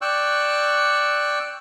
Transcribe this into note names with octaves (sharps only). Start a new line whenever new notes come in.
D5 G5 C#6 E6 F#6